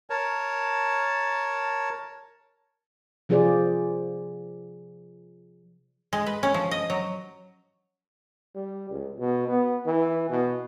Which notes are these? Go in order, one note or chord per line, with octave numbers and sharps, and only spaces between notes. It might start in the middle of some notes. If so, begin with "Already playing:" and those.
A#4 C#5 A5
C3 F3 F4 G#4 C5 D5
G#3
B4
C#4
F3
D#5
F#3
G3
C#2
B2
B3
E3
B2